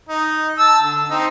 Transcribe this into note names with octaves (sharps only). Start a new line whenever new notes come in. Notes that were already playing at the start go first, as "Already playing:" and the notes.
D#4
A5 E6
D3
C4 D#4